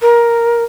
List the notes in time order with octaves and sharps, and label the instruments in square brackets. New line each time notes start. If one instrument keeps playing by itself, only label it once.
[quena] A#4